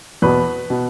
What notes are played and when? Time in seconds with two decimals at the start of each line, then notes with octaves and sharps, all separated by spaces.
0.22 E2 B2 B4
0.70 B2